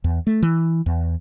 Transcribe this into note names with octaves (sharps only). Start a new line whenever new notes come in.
E2
A3
E3
E2